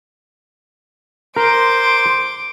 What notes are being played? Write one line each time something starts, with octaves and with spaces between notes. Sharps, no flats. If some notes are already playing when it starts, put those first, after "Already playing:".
A#4 C5 C6 D6 D7